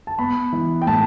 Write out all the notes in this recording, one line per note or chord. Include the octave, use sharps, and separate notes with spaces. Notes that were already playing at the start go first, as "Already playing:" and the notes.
A5
B3 B5
E3
G5
A2 A5